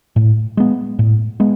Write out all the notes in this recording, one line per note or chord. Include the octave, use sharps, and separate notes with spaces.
A2
G#3 B3
A2
G#3 B3